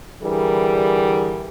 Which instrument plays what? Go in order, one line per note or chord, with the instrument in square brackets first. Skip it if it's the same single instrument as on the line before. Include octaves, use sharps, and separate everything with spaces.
[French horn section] D3 E3 G3 G#4 A#4